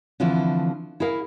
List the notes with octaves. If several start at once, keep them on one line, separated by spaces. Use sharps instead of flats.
D3 E3 F3 A3 C4 E4
E4 G#4 A#4 F5